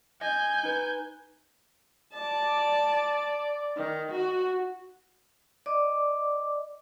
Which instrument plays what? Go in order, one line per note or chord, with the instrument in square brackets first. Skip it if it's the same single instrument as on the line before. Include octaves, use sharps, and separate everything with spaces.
[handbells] D#5 [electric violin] G#5 G6
[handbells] D#4 B4
[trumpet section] D5 [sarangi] A5
[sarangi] D#3
F#4
[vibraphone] D5 D#5 D6